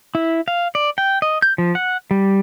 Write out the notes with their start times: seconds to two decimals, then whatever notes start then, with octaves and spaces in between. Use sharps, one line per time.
0.15 E4
0.48 F5
0.75 D5
0.98 G5
1.22 D#5
1.42 G6
1.58 F3
1.75 F#5
2.11 G3